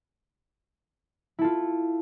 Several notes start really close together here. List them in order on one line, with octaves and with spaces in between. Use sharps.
E4 A4 F4